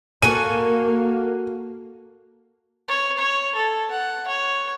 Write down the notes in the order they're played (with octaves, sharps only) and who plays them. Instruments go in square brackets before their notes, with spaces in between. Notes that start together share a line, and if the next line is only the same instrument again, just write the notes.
[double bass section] A#3 [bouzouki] F#4 A4 G#5 [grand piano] D#7
[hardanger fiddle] C#5
C#5
A4
F#5
C#5